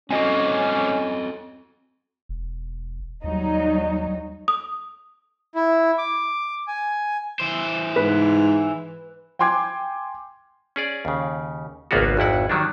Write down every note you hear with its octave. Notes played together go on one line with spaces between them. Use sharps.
G#2 A#3 C4 C#4 F#4 A4 D#5 G#5
E1
D#2 F#3 G3 D#4
D#6
E4
D6
G#5
E3 C5
G#2 B4
G5 G#5 C6 D6 G#6
C#4 G#4 D5
D#2 C#3
G#1 C#2 A#3 B3 F4 F#4
G#1 F2 E4 F#5
D#3 F#3 G3 D4